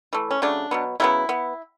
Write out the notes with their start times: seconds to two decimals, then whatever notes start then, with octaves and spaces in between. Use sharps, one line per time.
0.13 E3 A3
0.31 C#4
0.42 C#3 F#3 A3 D4
0.71 B2 F#3 B3
1.00 C#3 F#3 B3 E4
1.29 B3